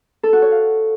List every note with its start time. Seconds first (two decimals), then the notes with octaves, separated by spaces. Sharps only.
0.23 A4
0.33 F#4
0.42 C#5
0.51 F5